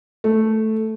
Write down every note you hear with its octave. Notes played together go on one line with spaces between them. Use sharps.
A3